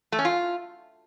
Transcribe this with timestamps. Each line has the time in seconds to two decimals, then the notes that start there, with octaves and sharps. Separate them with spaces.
0.12 A3
0.19 C#4
0.25 F4